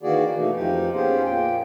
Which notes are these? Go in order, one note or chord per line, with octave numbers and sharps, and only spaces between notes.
D#3 E3 A#3 F#4 G#4 D5
B2 E3 A3 A#3 D#4
F2 F3 D#4 G4
A#3 B3 C#4 G4 G#4 C5
A#2 A#3 G5